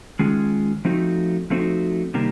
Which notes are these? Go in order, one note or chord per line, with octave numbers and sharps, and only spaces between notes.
D#3 G#3 C#4 F4 G#4
F3 A3 C4 D#4 F#4
F3 A3 C4 D#4 F#4
C3 D#3 G3 A#3